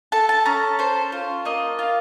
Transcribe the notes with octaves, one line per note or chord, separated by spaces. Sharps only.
A4 A5
A5
C#4 A#5
A4 C5
F4
A#3 D#5
F4